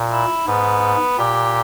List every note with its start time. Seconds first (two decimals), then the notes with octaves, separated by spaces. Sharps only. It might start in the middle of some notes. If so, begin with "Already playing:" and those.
Already playing: A#2
0.11 E4
0.47 G#2 B3
1.18 A#2 G4